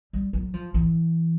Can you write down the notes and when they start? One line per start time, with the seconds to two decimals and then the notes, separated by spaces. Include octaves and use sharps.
0.13 G3
0.33 F#3
0.54 F3
0.74 E3